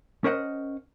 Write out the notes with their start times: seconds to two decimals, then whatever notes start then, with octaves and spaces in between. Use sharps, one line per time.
0.24 C#4 A#4 C5 D#5 F#5